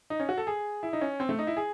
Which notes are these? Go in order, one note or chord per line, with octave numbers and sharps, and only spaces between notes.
D#4
C#4
F#4
A4
G#4
E4
D#4
C#4
C4
A3
D#4
E4
G#4